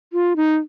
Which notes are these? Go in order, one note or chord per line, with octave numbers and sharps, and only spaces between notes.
F4
D#4